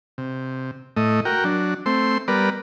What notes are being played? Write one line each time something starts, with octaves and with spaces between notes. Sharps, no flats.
C3
A2 A3 D#5
F#4 A#4 G5
F#3 D4
A3 C4 C6
G3 B3 A#4 B4 D5